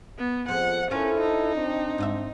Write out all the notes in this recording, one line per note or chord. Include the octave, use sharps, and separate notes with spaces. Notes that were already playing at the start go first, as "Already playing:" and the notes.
B3
F2 F3 G#4 F#5
C#4 D4 E4 F4 A4 A#4 C5
D#4
C4 D4
G#2 D#5 E5